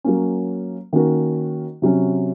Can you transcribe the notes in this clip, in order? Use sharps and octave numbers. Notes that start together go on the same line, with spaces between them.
F#3 A#3 C#4
D#3 A#3 C#4 F#4 A#4
C3 F#3 C#4